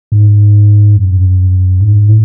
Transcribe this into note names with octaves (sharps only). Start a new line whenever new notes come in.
G#2
F#2
G#2
A2